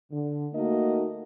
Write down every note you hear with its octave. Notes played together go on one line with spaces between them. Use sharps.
D3
A3 A#3 D#4 F#4 A#4 D#5